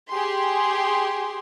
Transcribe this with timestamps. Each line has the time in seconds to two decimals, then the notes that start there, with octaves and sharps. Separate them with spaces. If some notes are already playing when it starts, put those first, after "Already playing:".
0.10 G4 G#4 C6